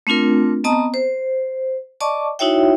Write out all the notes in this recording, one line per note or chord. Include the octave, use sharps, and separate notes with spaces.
A3 C4 D4 F4 A#4
B3 C4 D#5 A5 A#5 D#6
C5
D5 D#5 A5 C#6 D6
D#4 E4 F#4 C#5 E5 G5